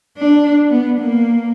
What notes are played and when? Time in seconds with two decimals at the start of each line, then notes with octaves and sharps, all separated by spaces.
0.17 D4
0.70 B3
0.99 A#3